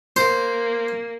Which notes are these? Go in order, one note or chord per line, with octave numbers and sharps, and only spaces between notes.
A#3 C5